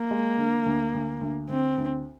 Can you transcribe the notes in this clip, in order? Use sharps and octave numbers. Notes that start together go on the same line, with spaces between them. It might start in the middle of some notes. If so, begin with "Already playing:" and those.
Already playing: A#3
G#3
D3
D2
D2
D2
D2 C4
D2